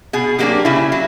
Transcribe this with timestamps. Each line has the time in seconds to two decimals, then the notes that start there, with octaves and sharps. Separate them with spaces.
0.13 B2 G#4
0.39 F#3 A#3 D4 G4
0.65 C#3 E4
0.92 F#3